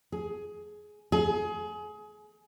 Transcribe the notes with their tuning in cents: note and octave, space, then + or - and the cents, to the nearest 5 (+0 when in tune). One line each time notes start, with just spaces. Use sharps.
G#4 +15
G#4 +25